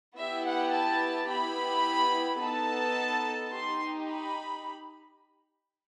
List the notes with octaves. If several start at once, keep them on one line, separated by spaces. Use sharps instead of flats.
B3 E4 G4 E5
F#5
A5
B3 E4 G4 B5
B3 D#4 A4 A5
D#4 G4 C6
B5